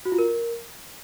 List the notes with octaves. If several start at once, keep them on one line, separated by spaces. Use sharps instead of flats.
F#4
F4
A#4